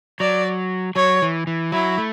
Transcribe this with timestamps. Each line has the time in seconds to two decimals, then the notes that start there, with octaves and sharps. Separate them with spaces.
0.20 F#3 D5
0.96 F#3 C#5
1.22 E3
1.47 E3
1.72 F#3 E4
1.98 A3